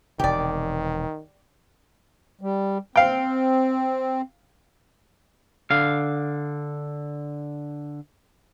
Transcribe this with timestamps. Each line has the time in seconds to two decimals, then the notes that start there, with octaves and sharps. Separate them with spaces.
0.19 E1 C3 D#3 G4 D5
2.41 G3
2.96 C4 F5 G5
5.71 D3 F5